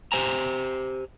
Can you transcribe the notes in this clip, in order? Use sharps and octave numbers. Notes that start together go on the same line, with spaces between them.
G4 C5 G#5 A#5